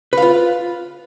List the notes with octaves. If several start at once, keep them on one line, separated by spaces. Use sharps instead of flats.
F4 B4 F5